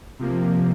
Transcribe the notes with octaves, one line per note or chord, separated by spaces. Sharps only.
C3 F3 A#3